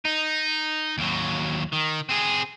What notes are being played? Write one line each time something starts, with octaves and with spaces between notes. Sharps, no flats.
D#4
D#2 F#3
D#3
C4 G#4